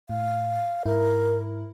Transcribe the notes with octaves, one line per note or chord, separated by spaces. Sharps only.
A2 F5
G#2 E4 A#4